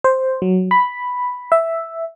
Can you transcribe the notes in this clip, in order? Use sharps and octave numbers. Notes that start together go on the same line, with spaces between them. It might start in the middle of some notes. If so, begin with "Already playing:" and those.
C5
F#3
B5
E5